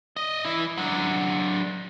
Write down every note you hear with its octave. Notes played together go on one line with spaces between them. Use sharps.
D5 D#5
E3 E4
F#3 D4